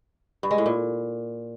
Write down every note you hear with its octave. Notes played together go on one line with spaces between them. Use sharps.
G2
G#3
A2
A#2